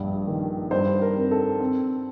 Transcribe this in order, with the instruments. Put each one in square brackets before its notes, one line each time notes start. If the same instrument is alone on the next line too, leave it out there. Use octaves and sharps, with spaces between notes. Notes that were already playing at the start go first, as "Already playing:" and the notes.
Already playing: [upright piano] A#1 G2
D#3
G2 C5
A#4
C4
A4
C4